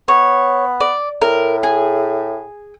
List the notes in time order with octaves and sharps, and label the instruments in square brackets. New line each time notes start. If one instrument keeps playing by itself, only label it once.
[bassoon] B3 [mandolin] C#5
[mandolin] D5
[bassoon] A2 [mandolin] A#4
[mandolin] G#4